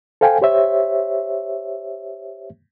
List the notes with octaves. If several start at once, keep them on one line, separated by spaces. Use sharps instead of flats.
A4 C5 F5 G5 G#5
G4 C5 C#5 E5